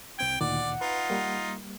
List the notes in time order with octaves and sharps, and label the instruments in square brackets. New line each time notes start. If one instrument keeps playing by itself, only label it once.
[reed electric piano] C2 C4 G#6 [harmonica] G5
[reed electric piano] D2 A#2 D#3 [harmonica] D5 [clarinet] F#5
[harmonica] D#4 F4 [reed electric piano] B4
[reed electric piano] G3 A#3